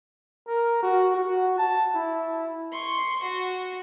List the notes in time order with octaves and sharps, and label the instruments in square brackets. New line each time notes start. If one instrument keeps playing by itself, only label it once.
[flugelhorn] A#4
F#4
F#4
A5
E4
[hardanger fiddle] C6 C#6
F#4